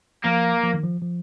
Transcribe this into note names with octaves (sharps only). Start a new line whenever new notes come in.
F3 A#3
F3
D#3
F3
F3